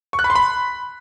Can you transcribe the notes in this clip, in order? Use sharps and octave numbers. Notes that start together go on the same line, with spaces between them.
C#6
F#6
B5
C6
B5